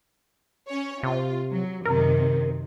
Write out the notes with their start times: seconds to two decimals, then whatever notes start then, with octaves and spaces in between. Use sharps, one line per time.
0.69 C#4 C#5
1.03 C3 F4
1.51 F#3
1.85 F#2 C3 D#3 A#4